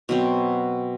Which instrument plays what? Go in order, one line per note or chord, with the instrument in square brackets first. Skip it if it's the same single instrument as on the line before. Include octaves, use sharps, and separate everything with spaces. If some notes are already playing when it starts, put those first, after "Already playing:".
[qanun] B2 F#3 C4